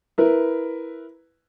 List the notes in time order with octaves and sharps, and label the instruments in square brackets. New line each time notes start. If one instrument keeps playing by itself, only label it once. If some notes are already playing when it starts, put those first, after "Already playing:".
[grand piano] E4 A#4 B4